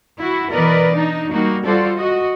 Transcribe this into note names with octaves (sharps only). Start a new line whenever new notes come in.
E4 F#4
B2 E3 A#4 B4 D5 D#5
D4 D#4
G3 A#3 D#4 F#4
G3 F4 F#4 A4 C5 D5
F#4 D#5